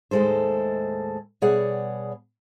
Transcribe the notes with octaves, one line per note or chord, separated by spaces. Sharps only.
D#2 A2 G#3 A4 C5
B2 G3 G#4 C#5 D5 F#5